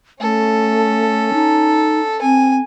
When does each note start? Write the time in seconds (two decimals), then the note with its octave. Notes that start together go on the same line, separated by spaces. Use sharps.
0.21 A3 C#4 A4
1.34 D#4
2.22 C4 G#5